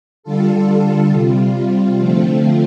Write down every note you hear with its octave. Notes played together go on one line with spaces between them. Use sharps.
D3 G3 F4 A4
C3 G3 F4
D3 F3 A3 C4 F4